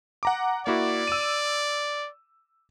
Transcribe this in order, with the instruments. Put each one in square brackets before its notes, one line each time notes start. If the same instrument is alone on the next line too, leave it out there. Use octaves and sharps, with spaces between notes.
[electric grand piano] F#5 A#5 D6
[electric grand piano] A#3 E4 F#4 [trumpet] D5
[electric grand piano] E6 D#7